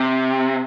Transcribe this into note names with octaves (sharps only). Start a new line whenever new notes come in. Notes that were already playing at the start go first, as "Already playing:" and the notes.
Already playing: C3